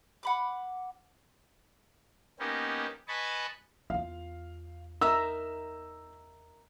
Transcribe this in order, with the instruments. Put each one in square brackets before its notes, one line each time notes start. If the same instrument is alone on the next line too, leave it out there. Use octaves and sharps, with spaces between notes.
[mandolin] F#5 B5 D6
[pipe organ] A#3 B3 C#4 D#4 G4
B4 D#5 G#5 A5 B5 C#6
[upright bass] E2 F4 [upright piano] F5
[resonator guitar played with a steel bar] D#4 A#4 E5 [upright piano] E6